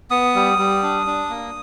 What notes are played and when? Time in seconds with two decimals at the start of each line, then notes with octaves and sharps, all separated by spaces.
0.11 B3 D#6
0.35 G3
0.58 G3
0.83 D4
1.07 D4
1.30 A#3